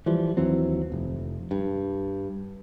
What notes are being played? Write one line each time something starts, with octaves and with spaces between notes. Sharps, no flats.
E3 F3 G3
D#2 E3 F#3 C4
F1
G2